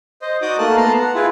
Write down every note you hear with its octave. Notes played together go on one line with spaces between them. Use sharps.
C5 D#5
D#4 F#4 D5 D6 D#6 G6
A3 A#3 A5 F#6
B3 A5 A#5 C6
F#5
E4 F4 G#4 B4